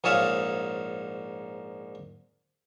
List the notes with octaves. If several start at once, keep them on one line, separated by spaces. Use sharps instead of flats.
A#1 G#2 G#4 C#5 E5 F5